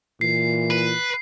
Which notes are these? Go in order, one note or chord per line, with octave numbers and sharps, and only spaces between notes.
A#2 E3 C7
B4